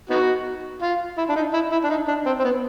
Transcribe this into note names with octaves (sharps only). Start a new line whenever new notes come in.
B3 D#4 F#4
F4
E4
D4
D#4
E4
E4
D4
D#4
D4
C4
C4
B3